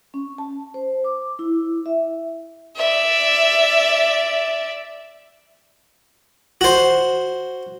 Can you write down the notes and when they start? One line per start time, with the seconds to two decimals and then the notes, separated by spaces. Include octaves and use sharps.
0.14 C#4
0.38 A5
0.74 C5
1.04 D6
1.39 E4
1.86 E5
2.76 D5 E5
6.61 F#4 C5